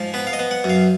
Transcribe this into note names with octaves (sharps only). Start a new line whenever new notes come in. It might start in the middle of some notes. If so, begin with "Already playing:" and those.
Already playing: G#2 F3
B3 B4
F5
D#5
B3
F#5
F#2
F5